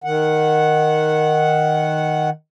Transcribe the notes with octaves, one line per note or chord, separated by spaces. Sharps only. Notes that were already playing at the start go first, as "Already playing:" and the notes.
D#3 F#5